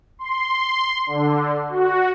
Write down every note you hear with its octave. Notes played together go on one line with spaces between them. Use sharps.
C6
D3
F#4